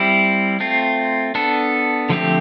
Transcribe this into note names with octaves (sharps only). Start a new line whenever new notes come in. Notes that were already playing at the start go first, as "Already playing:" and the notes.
Already playing: G3 C4 E4
A3 C4 F4
B3 D4 A4
D3 F3 A3 C4 G4